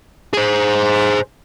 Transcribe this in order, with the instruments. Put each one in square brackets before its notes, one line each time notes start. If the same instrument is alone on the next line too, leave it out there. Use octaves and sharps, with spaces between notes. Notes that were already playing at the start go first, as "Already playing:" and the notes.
[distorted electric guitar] G#4 C5